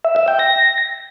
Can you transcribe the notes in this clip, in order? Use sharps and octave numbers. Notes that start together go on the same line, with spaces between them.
E5
E5
G5
A#6